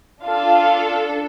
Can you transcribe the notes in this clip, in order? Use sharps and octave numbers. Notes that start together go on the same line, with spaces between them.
D4 F4 A4 F5